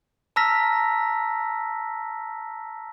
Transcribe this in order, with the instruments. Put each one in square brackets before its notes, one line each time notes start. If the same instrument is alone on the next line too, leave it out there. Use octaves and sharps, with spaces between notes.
[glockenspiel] A5 A#5 E6 F6 A#6 B6